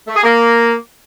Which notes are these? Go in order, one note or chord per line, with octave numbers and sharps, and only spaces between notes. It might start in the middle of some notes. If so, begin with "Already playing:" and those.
A3
G#4
A#3